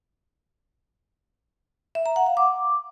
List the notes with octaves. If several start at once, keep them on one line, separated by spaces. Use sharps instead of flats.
E5
A#5
F#5
F5
D6